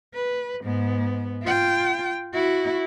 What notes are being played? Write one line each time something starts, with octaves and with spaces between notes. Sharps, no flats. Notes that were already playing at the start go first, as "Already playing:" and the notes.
B4
G#2 B3
F4 G5
E4 F#4